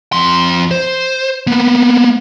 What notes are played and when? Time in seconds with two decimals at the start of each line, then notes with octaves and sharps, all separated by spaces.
0.12 F2 C6
0.71 C5
1.47 A#3 B3